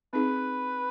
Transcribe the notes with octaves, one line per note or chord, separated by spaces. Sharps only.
C4 D#4 G#4 B4